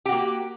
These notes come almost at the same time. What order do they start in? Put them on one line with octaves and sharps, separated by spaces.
G4 F#4 A#3